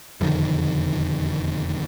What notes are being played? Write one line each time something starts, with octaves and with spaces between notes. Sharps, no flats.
E1 F2 D3 D#3